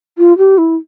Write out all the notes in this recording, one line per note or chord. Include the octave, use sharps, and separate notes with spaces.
F4
G4
E4